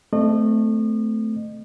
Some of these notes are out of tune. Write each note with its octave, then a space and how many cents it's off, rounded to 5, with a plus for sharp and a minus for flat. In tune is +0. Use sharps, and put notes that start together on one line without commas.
A3 +0 C4 -25 D#5 -35